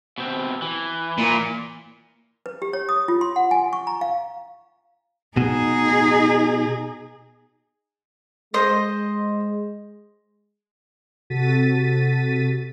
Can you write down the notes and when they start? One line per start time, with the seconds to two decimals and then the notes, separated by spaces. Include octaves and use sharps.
0.18 B2 C4
0.62 E3
1.18 A#2
2.46 B4
2.62 G4
2.73 C#5
2.89 D#6
3.08 F4
3.21 C6
3.36 F#5
3.51 G#5
3.73 C#6
3.87 A#5
4.01 F5
5.37 B2 D#4 G#4
8.54 G#3 C5 D#5
11.30 C3 F#4 A4 A6 B6 D#7